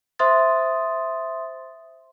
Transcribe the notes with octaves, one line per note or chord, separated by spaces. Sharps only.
C5 E5 C6 D#6 A6